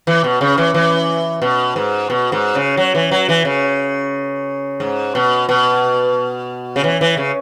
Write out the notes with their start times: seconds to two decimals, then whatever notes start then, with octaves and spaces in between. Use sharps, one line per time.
0.07 E3
0.24 B2
0.41 C#3
0.58 E3
0.74 E3
1.42 B2
1.76 G#2
2.10 B2
2.32 G#2
2.55 C#3
2.77 F#3
2.95 E3
3.11 F#3
3.29 E3
3.45 C#3
4.80 G#2
5.15 B2
5.49 B2
6.76 C#3
6.84 E3
7.01 E3
7.17 C#3